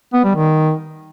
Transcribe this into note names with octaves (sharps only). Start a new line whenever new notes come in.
B3
G3
D#3